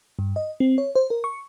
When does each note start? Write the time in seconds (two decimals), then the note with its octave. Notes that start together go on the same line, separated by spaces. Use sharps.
0.19 G2
0.36 D#5
0.60 C4
0.78 C#5
0.95 C5
1.10 A#4
1.24 C#6